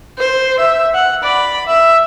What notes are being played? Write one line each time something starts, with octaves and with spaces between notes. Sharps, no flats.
C5
E5
F#5
D5 B5
E5